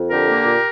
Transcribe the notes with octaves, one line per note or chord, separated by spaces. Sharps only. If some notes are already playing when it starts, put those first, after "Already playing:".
Already playing: F2
D3 G4 A#4
A#3
A#2